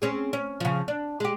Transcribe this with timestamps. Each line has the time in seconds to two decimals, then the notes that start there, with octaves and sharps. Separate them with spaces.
0.02 C4 C#4 G#4
0.33 C#4
0.60 C#3 F3
0.88 D4
1.20 G#3 G4